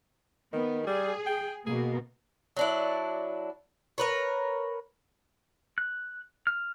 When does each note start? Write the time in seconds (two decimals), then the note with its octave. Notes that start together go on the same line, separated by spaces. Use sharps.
0.53 D#3 B3
0.87 G3 G#4
1.26 G5
1.67 B2 A#3 G#4
2.57 F#3 D4 E4
3.98 A#4 B4 C#5
5.78 F#6
6.47 F6